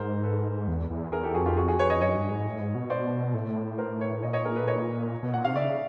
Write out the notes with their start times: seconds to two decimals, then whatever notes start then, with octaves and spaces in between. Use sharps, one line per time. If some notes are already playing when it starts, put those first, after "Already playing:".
Already playing: G#2 A#4 C5
0.23 A4 B4
0.68 E2
0.90 E2
1.12 E2 G#4 A#4
1.23 G4 A4
1.34 F2 F#4 G#4
1.46 F4 G4
1.56 F#4 G#4
1.68 F#4 G#4
1.79 B4 C#5
1.90 C#5 D#5
2.01 F#2 C#5 D#5
2.16 G2
2.31 G#2
2.46 A2
2.60 G#2
2.75 B2
2.90 C5 D5
3.34 A2
3.78 A#4 C5
4.01 B4 C#5
4.22 A#2 C#5 D#5
4.33 C#5 D#5
4.44 G#4 A#4
4.56 A4 B4
4.67 C#5 D#5
5.23 B2
5.34 A#2 F#5
5.45 C3 F5
5.55 C#3 D5 E5